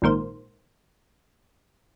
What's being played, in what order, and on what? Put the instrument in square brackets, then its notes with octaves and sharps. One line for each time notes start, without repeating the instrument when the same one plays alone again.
[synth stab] A#1 G#2 D#3 A#3 C5